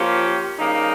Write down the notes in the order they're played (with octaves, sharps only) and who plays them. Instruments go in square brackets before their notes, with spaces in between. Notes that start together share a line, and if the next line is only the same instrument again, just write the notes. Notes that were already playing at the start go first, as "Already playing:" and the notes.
Already playing: [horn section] F3 A#3 C#4 G4
C#3 G3 A#3 D#4